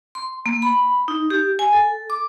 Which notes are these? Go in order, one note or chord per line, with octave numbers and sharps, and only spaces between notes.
C6
A#3
B5
D#4
G4
G#5
A4
D6